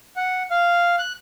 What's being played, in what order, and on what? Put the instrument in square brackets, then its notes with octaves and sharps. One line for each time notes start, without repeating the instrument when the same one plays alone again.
[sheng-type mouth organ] F#5
F5
F#6